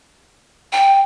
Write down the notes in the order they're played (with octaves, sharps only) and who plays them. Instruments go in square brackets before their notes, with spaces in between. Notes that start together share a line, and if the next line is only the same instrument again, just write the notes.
[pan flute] G5